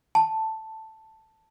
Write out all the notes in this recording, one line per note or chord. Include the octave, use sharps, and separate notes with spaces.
A5